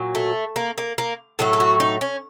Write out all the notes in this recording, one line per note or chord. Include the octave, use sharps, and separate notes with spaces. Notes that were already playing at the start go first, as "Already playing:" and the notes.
Already playing: A#2 F#3
A3
A#3
A#3
A#3
A2 F#3 A3 A4
A4
F#4
D#4
C#4